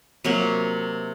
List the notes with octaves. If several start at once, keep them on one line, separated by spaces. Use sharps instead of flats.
C3 F#3 A#3